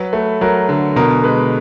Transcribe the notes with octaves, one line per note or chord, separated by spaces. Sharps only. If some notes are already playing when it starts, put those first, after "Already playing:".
Already playing: F#3 B4
A3
F#3 A#4
D3
B2 A#4
G#3 B4